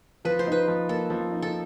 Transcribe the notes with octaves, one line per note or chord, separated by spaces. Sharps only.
F3 B4
C5
D#4 B4
F3
A#3 A4
F3
D#4
A4